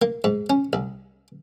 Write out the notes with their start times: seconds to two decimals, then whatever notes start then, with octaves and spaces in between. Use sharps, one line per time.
0.02 A#3
0.24 G#2
0.50 C#4
0.73 C2